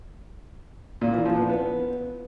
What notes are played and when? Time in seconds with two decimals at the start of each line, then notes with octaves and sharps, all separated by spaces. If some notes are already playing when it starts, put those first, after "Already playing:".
1.01 A#2
1.13 E3
1.25 F3
1.37 B3
1.49 B3